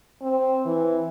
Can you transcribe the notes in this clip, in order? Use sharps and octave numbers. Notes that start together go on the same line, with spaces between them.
C4
E3